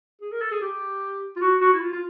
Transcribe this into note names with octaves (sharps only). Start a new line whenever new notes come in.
G#4
A#4
A4
G#4
G4
F4
F#4
F#4
E4
F4
F4